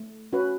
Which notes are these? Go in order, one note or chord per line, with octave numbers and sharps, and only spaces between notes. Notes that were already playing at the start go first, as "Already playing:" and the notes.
Already playing: A3
C#4 F#4 B4